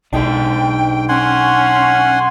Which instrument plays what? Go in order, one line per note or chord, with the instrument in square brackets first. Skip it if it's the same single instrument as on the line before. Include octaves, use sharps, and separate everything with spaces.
[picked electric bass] B1 [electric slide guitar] D4 D#4 G#4 [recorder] G5
[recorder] C#4 [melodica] F#5 G#5 C6